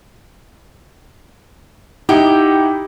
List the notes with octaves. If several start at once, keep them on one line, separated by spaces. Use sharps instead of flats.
D#4 E4 G4 F#5